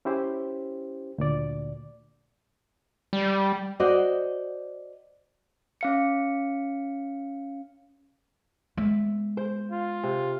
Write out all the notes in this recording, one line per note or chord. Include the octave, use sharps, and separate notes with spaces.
C#4 E4 G4 C5
D2 A#2 D5
G3
F#4 C5 D5 D#5
C#4 F5 C#7
G#3 B3 E5
C5
F4
C3